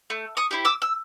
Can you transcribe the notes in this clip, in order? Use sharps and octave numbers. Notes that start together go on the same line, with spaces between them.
A3
C#6 D#6
C4 E4 G4
D6 E6
E6